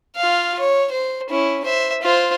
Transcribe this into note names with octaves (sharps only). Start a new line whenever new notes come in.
F4 F5
C#5
C5
C#4 E4
C5 E5
F4 C5